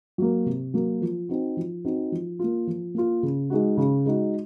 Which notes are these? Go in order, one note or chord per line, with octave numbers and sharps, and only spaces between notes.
F#3 A#3
C3
F#3 A#3
F3
C4 D#4 F#4
F3
C4 D#4 F#4
F3
A#3 F4
F3
A#3 F4
C#3
G#3 D#4 F#4
C#3
G#3 D#4 F#4